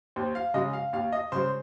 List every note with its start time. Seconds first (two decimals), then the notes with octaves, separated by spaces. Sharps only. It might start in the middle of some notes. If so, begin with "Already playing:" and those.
0.16 D#2 C5
0.35 F5
0.54 C#3 G#3 D#5
0.73 F5
0.93 D#2 F5
1.12 D#5
1.32 C#3 G#3 C5